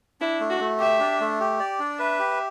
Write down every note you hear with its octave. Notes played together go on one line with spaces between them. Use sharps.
D4 E4
A3
F#4
A3
G4 E5
D4
A3
G4
D5
D4
B4 E5
G4